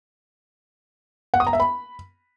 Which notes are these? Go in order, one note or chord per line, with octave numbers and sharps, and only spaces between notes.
F#5
D#6
A#5
E5
B5